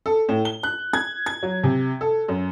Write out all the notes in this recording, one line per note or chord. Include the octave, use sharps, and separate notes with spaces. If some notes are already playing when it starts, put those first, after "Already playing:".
A4
A2
G7
F#6
G#6
G#6
F#3
C3
A4
F#2